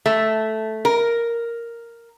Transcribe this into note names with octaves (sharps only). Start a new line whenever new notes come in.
A3
A#4